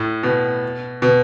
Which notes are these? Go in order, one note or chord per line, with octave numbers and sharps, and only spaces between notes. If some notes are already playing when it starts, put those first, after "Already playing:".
Already playing: A2
B2
B2